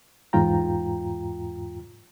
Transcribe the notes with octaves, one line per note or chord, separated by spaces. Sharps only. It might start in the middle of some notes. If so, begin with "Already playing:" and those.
E2 G#2 F4 G5 A#5